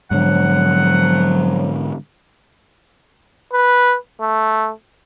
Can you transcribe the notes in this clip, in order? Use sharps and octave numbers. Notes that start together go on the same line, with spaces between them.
G#2 D3 F3 F#3 F#5
B4
A3